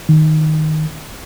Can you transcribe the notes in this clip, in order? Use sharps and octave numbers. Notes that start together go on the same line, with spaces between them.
D#3